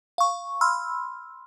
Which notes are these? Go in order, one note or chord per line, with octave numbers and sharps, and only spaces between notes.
F5 C#6
B5 C6 E6 F6